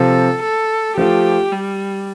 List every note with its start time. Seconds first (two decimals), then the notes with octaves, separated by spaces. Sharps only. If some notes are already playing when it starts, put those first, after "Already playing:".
Already playing: C3 F3 C4 F4 A4
0.43 A4
0.97 F3 A3 F4 G4
1.52 G3